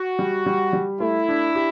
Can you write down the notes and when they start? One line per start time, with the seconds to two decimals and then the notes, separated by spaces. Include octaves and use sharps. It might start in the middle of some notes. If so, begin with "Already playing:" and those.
Already playing: F#4
0.19 G3
0.46 G3
0.73 G3
1.00 A3 E4
1.29 D4
1.55 G4